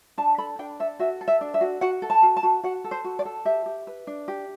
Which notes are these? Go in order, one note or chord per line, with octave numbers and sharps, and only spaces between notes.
D4 A5
A4 B5
D4 G5
A4 E5
F#4 E5
A4
E5
D4
E5
F#4
F#4 F#5
A4
A5
F#4
A5
F#4
F#4 F#5
A4
C5
F#4
D5
A4
G4 E5
G4
B4
D4
G4